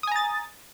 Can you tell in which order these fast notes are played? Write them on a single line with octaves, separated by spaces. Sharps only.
D#6 G#5 A#5 A6